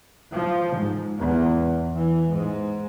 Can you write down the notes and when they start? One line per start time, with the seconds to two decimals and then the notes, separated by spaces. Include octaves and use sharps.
0.33 F3
0.76 G#2
1.20 E2
1.95 E3
2.29 G#2